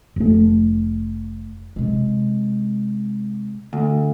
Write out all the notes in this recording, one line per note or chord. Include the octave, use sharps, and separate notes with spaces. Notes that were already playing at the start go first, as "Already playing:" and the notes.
F1 A3
C3 G#3
D2